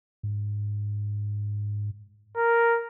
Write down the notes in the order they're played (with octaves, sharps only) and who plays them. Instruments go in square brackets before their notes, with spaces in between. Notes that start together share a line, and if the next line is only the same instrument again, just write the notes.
[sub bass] G#2
[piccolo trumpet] A#4